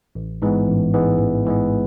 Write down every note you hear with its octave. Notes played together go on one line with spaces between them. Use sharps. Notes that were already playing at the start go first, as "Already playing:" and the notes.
A1
G#2 E3 G#3 B3
A1
G#2 E3 G#3 B3
A1
G#2 E3 G#3 B3